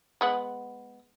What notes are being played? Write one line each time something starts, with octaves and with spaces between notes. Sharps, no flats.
G#3 B3 F#5